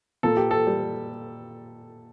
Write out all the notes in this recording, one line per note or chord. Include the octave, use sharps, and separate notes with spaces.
A#2 A4
G4
A4
G3